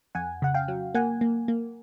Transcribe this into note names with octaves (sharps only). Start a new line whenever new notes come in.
F2 F#5 G#5
C#3 F#5
F5 G5
F#3
A#3 F#5 G#5
A#3
A#3